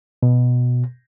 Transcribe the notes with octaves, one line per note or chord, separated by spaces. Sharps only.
B2